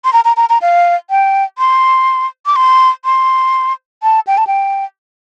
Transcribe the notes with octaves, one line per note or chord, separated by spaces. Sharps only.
C6
A#5
A#5
A#5
A#5
F5
G5
C6
D6
C6
C6
A5
G5
A5
G5